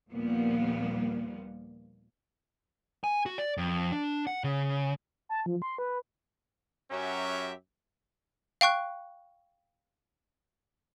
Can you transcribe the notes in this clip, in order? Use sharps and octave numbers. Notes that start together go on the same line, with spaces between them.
D#2 A#2 F3 G3 A#3 B3
G#5
F#4
D5
F2
D4
F#5
C#3
A5
F3
C6
B4
F#2 F#3 C#4 G4 E5
F5 G5 C#6 F#6